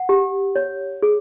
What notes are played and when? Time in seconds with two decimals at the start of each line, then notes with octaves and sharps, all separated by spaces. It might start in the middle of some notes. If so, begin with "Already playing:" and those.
Already playing: F#5
0.09 G4
0.56 C#5
1.03 G#4